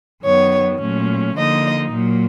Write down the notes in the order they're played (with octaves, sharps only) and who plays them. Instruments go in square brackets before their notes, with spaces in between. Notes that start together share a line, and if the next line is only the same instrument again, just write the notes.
[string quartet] F#2 D#3 F#3 B3 C#5
A#2 F#3 A3 C#4
D3 F3 A#3 D#4 D#5
A#2 F#3 A#3